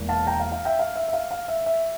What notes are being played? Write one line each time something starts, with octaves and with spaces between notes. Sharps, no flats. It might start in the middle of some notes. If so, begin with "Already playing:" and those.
Already playing: E1 E2 E3 A#3
F5 A5
G5 A#5
F5
F5
E5 G5
F5
E5
E5
F5
F5
E5
E5